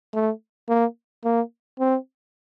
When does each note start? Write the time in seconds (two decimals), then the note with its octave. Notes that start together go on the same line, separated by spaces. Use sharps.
0.14 A3
0.68 A#3
1.24 A#3
1.79 C4